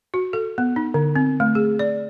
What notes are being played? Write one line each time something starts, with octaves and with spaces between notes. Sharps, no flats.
F#4
A4
B3
D#4
D3
C4
A3
G#4
D5